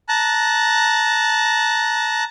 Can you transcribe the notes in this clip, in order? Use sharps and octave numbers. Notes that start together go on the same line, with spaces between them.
A5 A#5 F#6